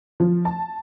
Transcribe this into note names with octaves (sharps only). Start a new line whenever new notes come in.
F3
A5